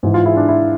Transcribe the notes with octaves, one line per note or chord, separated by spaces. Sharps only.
G#2 E3
F4
E4 G#4
D4
E4